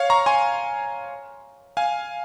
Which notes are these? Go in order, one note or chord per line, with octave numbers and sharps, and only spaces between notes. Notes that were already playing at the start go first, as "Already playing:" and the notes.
Already playing: C#5 F5
A#5 C#6
G#5 C6
F5 G#5